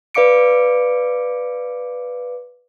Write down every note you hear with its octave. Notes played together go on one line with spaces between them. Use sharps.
B4 D5 F5 D6 C#7 D7